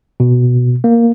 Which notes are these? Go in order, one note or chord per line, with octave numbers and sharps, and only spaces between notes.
B2
A#3